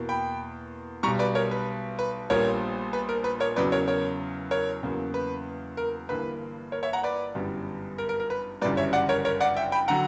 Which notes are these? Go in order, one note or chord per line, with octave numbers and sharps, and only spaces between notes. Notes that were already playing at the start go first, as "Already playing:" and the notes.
Already playing: E2 B2 A#3
G5 B5
B1 B2 G3 A#5 C#6
B4 D5
A#4 C#5
B4
B4
A#1 A#2 G3 B3 A#4 C#5
B4
A#4
B4
A#4 C#5
E2 C#3 F#3 B3 B4 D5
A#4 C#5
A#4 C#5
A#4 C#5
E2 C#3 F#3 A#3
B4
A#4
G1 G2 E3 A#3 B4
A#4 C#5
C#5 E5
F#5 A#5
B4 D5
G1 F#2 E3 G3 B3
A#4
A#4
A#4
B4
G1 F#2 C#3 E3 G3 B4 D5
C#5 E5
D5 F#5
A#4 C#5
A#4 C#5
D5 F#5
E5 G5
G5 B5
D3 F#3 F#5 A#5